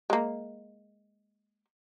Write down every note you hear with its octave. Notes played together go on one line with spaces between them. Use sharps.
G#3 A#3